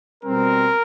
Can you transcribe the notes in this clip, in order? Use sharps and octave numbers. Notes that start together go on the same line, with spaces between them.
B2 G3 C4 A#4